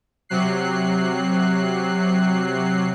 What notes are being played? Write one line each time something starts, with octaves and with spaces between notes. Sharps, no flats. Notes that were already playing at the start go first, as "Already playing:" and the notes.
C3 F#3 F#6 C7